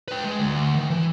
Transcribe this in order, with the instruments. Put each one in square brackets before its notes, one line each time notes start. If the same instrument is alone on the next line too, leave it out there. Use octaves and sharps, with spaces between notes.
[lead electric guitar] B4 G5
G#3
D2
D#3
E3